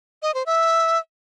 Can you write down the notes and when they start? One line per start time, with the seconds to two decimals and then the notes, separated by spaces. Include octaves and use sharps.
0.22 D#5
0.34 C5
0.46 E5